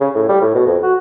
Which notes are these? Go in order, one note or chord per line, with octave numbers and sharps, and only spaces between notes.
C#3
A2
G3
A2
B2
F2
F#4